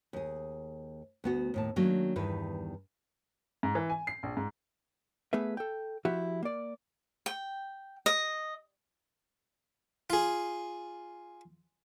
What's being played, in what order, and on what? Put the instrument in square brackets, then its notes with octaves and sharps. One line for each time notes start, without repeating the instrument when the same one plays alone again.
[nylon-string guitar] D#2 G#4
D2 B3 F#4
D#2 A2 A5
D#3 F#3 A#3 C#4 D4
E2 G2 D#3 E4 B4
[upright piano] G#2
E3
G#5
C7
A#1
G#2
[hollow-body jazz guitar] A3 B3 G#4 B4 E5
A4 G5
F3 E4 F#4 G4 E5
A#3 D5
[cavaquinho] G5
D#5
[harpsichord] F4 G#4